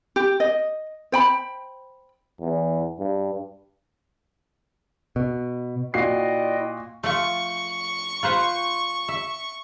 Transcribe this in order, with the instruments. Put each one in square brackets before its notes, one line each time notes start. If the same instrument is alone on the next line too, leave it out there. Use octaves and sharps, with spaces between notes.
[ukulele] G4
D#5
C5 G5 B5
[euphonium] E2
G2
[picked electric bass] B2
[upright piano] A#2 F#4 C7 [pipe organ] E4 D5 G5 [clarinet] D#5
[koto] F3 A3 [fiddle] C#6
[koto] F4 B4 C5
E5